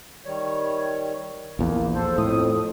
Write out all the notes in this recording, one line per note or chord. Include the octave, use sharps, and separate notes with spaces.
D#3 G3 C#5
A#1 E2 A#3
A4 C5
F2 A2 D#6